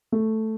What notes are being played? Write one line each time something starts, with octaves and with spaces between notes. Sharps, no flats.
A3